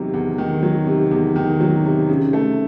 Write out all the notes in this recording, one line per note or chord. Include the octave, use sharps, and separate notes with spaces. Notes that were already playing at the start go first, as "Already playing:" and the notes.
Already playing: E2 C3 D#3 F#3
E2
D#3
F#3
C3
E2
D#3
F#3
C3
C#3
A3